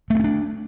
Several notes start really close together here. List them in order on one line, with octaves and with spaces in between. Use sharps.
A3 B3 C#4 D4